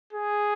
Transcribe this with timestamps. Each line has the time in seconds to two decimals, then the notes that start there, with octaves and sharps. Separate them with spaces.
0.13 G#4